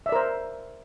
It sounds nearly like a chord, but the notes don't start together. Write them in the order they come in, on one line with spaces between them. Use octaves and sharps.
E5 D5 A#4 C5